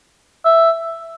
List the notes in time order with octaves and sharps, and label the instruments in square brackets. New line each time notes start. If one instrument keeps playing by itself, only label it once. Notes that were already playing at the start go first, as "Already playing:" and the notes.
[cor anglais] E5